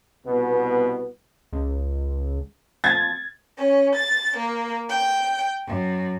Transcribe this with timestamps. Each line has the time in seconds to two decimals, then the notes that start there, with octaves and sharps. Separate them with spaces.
0.25 C2 B2 B3
1.53 C#2
2.84 F3 G#6 A6
3.58 C#4
3.95 A6
4.37 A#3
4.89 G5
5.68 F#2